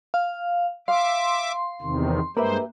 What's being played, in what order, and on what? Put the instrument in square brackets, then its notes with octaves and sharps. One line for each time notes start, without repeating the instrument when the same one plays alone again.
[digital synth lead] F5
[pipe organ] E5 D6 [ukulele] F5 [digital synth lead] C6
[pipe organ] E2 C3 D#3
[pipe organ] G2 G#3 C5 [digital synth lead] A#3 [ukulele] G4 B4 E5